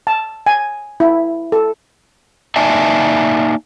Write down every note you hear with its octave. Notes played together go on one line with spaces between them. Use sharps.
A5
G#5
E4
A4
A#3 D#4 D5 E5 G#5 A5